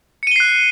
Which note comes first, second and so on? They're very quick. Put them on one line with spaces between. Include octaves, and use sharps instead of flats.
C#7 D#7 G7 C7 F#6